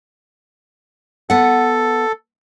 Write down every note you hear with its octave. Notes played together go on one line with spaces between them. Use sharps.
B3 A4 F#5